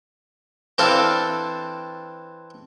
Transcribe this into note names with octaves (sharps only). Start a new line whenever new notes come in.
E3 C4 D4 A4 F5